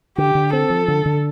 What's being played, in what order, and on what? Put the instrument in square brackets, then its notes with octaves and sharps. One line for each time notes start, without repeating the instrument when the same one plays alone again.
[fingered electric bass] D3 [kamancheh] G4
[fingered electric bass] D3
[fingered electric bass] C4 [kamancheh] A4
[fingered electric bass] F3
D3
D3